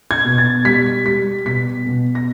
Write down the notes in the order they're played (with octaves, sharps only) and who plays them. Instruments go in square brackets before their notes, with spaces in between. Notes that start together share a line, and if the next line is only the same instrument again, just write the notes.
[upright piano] G#6
B2
A6
G3 B6
G3 B6
B2 B6
B2
A#6